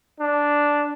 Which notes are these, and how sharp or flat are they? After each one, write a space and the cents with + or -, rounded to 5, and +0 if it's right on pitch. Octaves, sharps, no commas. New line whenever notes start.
D4 -5